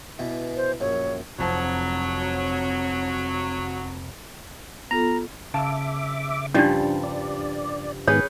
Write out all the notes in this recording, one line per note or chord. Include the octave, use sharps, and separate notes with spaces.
B2 E3
C5
A#1 F#2 C#5
F1 F3 F#3 C4 A5
B3 F4 A4 A#5
C#3 E5 F5 A5 D6
G2 F3 G3 C#4 D4
D5
G#2 D#3 B3 C#4 G#4 B4 C#5